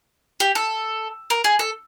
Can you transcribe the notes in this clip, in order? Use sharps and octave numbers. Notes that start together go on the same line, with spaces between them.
G4
A4
A#4
G#4
A4